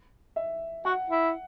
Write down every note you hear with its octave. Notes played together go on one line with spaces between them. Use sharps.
E5
F#4 F#5
E4